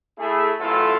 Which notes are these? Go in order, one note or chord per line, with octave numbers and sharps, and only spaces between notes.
A3 E4 G#4
A1 F#2 A3 E4 F4 A4